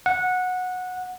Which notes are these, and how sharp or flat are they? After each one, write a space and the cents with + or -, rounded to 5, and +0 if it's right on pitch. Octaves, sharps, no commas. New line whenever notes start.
F#5 -15